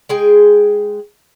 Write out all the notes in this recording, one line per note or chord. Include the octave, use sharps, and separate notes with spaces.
G#3 G#4 G5